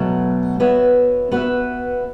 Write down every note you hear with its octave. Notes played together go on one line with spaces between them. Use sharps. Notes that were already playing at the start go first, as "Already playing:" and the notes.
Already playing: B2 F#3 A3
B3 F#4 C#5 E5
B3 F#4 B4 E5